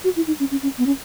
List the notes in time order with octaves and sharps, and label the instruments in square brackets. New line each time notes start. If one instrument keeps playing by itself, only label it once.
[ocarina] F#4
E4
D#4
C#4
C#4
C#4
B3
C#4